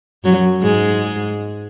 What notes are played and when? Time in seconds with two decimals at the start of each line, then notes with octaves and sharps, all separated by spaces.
0.24 F#2 F#3
0.63 G#2 G#3